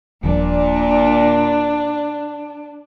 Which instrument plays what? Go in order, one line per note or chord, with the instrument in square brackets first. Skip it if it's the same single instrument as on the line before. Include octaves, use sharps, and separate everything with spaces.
[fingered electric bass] D#1 F3 [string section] A#2 [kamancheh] D4